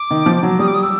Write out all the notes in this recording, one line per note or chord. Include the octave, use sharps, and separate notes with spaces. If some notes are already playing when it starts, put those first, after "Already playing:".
Already playing: D6
D#3
F3
F#3
G3 D#6
D6
D#6
E6